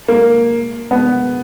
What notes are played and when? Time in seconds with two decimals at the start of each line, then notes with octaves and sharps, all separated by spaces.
0.08 A#3
0.91 B3